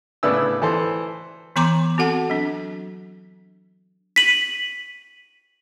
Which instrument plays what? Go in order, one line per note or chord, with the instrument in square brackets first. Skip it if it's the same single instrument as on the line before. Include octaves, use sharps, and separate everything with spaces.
[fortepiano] A2 C#3 B3 D4 E4 E6
E3 A4 C5
[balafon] E3 B3 A#5 C6 D6
C4 F#4 A4 F#5 A5
F#3 D4
[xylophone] B6 D#7 F#7